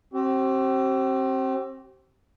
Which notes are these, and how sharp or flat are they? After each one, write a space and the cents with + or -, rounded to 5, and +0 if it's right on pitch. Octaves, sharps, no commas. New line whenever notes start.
C4 +30 G4 -40